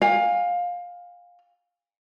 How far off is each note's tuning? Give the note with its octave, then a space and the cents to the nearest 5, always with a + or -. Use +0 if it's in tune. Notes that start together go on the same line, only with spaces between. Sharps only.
F5 +20 G#5 -35